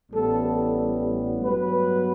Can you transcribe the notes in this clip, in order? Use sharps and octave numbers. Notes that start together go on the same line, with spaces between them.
A1 A2 G3 B3 A4
A4
G2 F#3 B3 B4